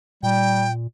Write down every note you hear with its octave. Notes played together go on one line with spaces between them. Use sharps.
A#2 G3 G5